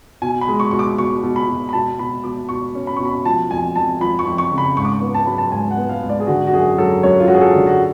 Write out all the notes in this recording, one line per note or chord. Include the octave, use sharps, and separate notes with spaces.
B2 G#5
B5
G#3
C#6
B2 C#6
D6
B2 C#6
B2
B5
B2
B5
B2 A5
B2 B5
B2 D6
B2 C#6
C#4
B5
B2 C#6
B5
F3 A5
F2 G#5
F2 A5
F3 B5
C#6
F2
C#6
C#3
B5
G#2 C#6
D6
C#6
B3
A5
F#3 B5
A5
G#2 G#5
F#5
B3
F5
G#2
D5
G#4
D3 F#4
F#4
F#2 G#4
F#3 A4
F#2 C#5
F4
F#3 F#4
G#4
A4
D3
F#4